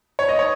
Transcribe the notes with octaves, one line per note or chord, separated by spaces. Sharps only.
C#5
D#5
C#5